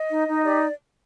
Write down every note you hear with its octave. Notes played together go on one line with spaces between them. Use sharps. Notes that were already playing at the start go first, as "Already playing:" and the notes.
Already playing: D#5
D#4
D#4
G4 D5